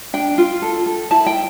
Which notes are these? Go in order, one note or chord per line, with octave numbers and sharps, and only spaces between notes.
D4 G5
F4
A4
A4
E4 A5
G5